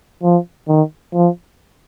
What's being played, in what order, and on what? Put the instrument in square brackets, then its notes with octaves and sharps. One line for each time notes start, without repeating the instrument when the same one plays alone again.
[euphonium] F3
D#3
F3